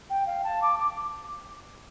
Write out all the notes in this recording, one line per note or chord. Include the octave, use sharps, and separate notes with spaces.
G5
F5
A5
D6
D6